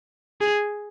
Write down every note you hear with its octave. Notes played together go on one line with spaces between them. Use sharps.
G#4